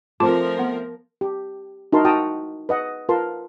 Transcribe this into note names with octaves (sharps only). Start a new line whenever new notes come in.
F3 A3 C4 F4 A#4 A5 D6
B3
G4
D#4 E4 F#4 A#4 A5 C6
F#4 G5 A5 A#5 D#6
B4 D#5 F#5
F4 A#4 B4 A5 C6